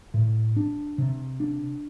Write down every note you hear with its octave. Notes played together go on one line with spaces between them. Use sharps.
A2
D4
C3
D4